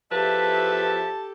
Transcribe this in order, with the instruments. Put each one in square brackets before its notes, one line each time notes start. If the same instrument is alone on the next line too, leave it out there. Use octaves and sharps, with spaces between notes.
[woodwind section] E2 F3 E5 [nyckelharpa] G4 A4 [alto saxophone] B4 [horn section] A5